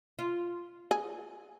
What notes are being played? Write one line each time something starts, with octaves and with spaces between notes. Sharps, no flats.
F4
G#4